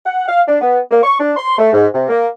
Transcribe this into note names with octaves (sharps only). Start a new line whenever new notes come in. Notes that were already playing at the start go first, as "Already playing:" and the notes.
F#5
F5
D4
B3
A#3
C#6
D4
C6
A3
G#2
C3
A#3